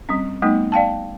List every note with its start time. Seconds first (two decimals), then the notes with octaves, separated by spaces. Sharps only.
0.09 G3 C4 C#4
0.42 G3 A3 B3 D#4
0.72 D5 F5 G5 A5